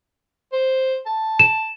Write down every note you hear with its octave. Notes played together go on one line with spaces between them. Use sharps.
C5
A5
E7